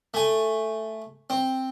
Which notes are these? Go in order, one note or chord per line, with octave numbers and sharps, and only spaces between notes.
A3 G#5
C4